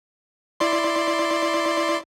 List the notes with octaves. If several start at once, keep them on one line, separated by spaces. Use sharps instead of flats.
E4 D5 C6